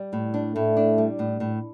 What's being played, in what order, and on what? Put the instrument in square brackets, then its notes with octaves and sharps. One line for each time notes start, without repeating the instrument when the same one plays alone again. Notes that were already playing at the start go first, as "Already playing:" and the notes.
Already playing: [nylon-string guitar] G3
A2
D4
[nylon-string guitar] A2 [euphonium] A3
[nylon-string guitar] D4
G3
A2
A2